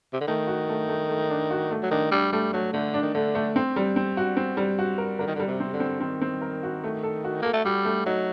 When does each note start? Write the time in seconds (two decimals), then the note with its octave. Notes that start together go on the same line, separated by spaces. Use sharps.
0.13 C3
0.20 D3
0.27 D#3 A3
0.47 F#4
0.69 A3
0.89 A3
1.09 A3
1.30 D4
1.51 F#4
1.71 A3
1.83 F#3
1.91 D#3 D4
2.11 G3 D4
2.32 G3 A3
2.53 F#3 A3
2.73 D3 A3
2.94 D4
3.02 D#3
3.14 D3 A3
3.35 A3
3.56 C4
3.76 G3
3.96 C4
4.17 F#4
4.37 C4
4.57 G3
4.79 F#4
4.98 A#4
5.19 D3 A#4
5.27 D#3
5.35 D3 G3
5.47 C3
5.60 C4
5.73 D3
5.80 C4
6.00 D#3 C4
6.21 C4
6.41 A#4
6.63 F#4
6.84 A3
7.03 A4
7.25 F#4
7.42 A#3 A4
7.53 A3
7.65 G3 F#4
7.85 A3
8.06 F#3 D#4